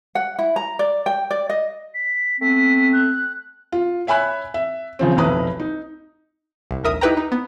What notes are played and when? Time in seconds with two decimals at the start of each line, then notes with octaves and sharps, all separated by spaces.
0.15 F#5
0.39 E4
0.56 A#5
0.79 D5
1.06 G5
1.31 D5
1.50 D#5
1.94 B6
2.40 A3 B3 C4 B6
2.93 F#6
3.72 F4
4.07 C#5 E5 G#5 B5 F#6
4.54 E5
4.99 C#3 F3 C4
5.17 F1 B1 E4 B4 A#5 D#6
5.60 D#4
6.71 C2
6.84 A#1 D#2 A#4 E5 D#6
7.01 D#4 E4 G4 B4 G5 A#5
7.17 D#4
7.32 B3